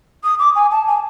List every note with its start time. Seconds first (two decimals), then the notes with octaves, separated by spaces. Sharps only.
0.24 D#6
0.39 D6
0.55 G#5
0.71 A5
0.87 G#5